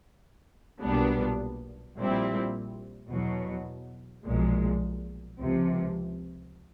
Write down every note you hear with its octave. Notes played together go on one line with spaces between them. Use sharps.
B1 A#2 G3 B3 D4
A#1 A#2 G3 C4 E4
E2 B2 F#3
B1 A#2 F3 G#3
C#2 C3 F3